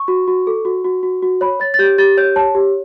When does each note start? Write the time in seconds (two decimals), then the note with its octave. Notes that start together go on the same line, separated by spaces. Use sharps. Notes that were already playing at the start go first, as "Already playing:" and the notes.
Already playing: C#6
0.08 F#4
0.28 F#4
0.47 A4
0.65 F#4
0.85 F#4
1.03 F#4
1.23 F#4
1.41 C#5 B5
1.60 C#5 A6
1.74 A6
1.79 G4 G6
1.98 G4 A6
2.17 C#5 G6
2.36 C#5 A5
2.55 G4